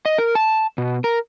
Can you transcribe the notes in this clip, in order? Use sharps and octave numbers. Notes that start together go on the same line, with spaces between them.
D#5
A#4
A5
B2
A#4